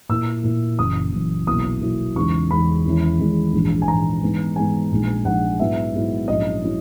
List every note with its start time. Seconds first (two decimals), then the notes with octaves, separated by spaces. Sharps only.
0.09 A#2 A#3 E4 E6
0.44 A#2 A#3 E4
0.79 F#1 F#2 E3 D#6
1.13 F#1 F#2 E3
1.47 B1 B2 F#3 A#3 E4 D#6
1.81 B1 B2 F#3 A#3 E4
2.15 E2 C#3 G#3 D#4 C#6
2.51 E2 C#3 G#3 D#4 B5
2.85 E2 D#3 G#3 C#4 E4
3.19 E2 D#3 G#3 C#4 E4
3.53 A#1 G#2 E3
3.82 G#5
3.87 A#1 G#2 E3 A#5
4.22 G#2 E3 G#3 B3 D#4
4.56 G#2 E3 G#3 B3 D#4 G#5
4.91 A#1 A#2 G#3 D#4
5.25 A#1 A#2 G#3 D#4 F#5
5.59 G#2 F#3 B3 E4 E5
5.94 G#2 F#3 B3 E4
6.28 A#1 G#2 F#3 C#4 E4 D#5
6.64 F#3 C#4 E4